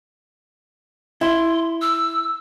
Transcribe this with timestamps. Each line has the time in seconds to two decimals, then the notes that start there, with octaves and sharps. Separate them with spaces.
1.21 E4 C6
1.82 E6